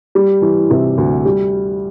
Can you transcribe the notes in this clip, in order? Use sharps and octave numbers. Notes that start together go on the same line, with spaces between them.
G3
E3
C3
D2
G3